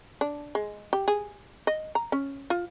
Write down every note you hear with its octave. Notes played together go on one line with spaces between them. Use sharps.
D4
G#3
G4
G#4
D#5
A#5
C#4
F4